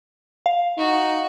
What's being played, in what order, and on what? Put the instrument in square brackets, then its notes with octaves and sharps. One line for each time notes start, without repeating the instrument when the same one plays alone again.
[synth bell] F5
[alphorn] D#4 [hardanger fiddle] F#4